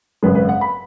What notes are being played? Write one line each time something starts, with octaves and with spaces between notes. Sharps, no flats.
G#1 F#2 C#3 G#3 B4
B4
F#5
B5